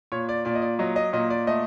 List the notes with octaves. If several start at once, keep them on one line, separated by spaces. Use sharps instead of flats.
A#2 C#5
D5
A#2 D5
D#5
D5
F#3 D#5
D#5
A#2 D#5
D5
A3 D#5